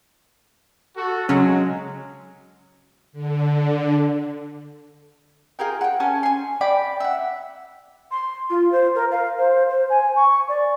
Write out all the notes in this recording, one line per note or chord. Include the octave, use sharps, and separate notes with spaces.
F#4 A4
C#3 F#3 G#3 C#4
D3
F4 G#4 A#4 G5
F#5 G5
C#4 C#5 G#5 A5
G#5 C6
D5 G5 B5 D6
E5 F#5
C6
F4
C5
A#4
F5
C5
C5
G#5
C#6
D5